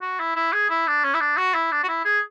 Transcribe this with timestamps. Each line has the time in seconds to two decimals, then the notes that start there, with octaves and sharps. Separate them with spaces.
0.02 F#4
0.20 E4
0.36 E4
0.53 G#4
0.70 E4
0.88 D4
1.04 C#4
1.15 E4
1.21 D4
1.38 F#4
1.55 E4
1.72 D4
1.84 F#4
1.89 E4
2.05 G#4